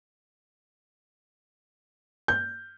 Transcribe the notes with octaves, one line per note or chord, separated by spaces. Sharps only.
G6